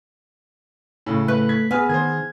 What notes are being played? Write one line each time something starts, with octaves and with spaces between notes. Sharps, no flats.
A2 C#3
A3 B4 F#6
G#6 B6
B3 G#4 B4 G#5 F6
D#3 G#4 C5 G#6